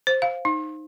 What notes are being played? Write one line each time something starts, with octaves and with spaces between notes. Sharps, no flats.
C5
F5
D#4